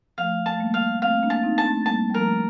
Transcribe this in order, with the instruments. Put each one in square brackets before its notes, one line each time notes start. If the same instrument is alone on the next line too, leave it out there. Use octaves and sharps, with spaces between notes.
[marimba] F3 A3 [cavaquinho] F5
[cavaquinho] A5
[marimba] A3
G3 A#3
[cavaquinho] F5
[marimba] A3 C4 [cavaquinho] F5
[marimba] C4
A#3 D4
[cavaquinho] A5
[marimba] C4 D#4
[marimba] D4 [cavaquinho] A5
[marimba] A3 C4
[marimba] G3 A#3 [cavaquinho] A5
[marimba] G3
[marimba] F3 A3 [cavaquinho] A#4